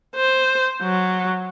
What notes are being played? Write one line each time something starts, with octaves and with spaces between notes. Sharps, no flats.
C5
F#3